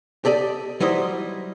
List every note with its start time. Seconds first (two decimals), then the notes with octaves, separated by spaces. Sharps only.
0.25 G4 A4 D5 D#5
0.80 F#3 G3 E4 C5 D#5